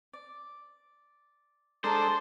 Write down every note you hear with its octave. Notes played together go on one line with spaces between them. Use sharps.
D5
G#3 D4 A4 C5 A5 A#5 D#6